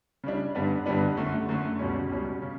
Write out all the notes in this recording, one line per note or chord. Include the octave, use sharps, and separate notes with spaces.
C#3 G3 D4
G2 D3 G3 B3 D4
G2 D3 G3 B3 D4
F#2 D3 A3
F#2 D3 A3
C#2 B2 G3 C#4
C#2 B2 G3 C#4
C#3